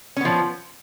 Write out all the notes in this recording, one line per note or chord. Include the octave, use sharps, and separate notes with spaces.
F3 B3 C#4